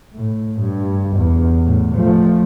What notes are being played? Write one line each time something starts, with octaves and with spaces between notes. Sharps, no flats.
A2
G2
E2
A2
F3 A3